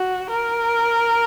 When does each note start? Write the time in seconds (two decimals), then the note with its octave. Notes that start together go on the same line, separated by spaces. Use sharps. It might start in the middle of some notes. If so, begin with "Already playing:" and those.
Already playing: F#4
0.30 A#4